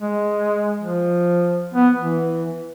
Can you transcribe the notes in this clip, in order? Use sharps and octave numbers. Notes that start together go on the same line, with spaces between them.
G#3
F3
B3
E3